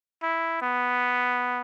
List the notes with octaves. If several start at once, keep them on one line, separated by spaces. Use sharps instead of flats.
E4
B3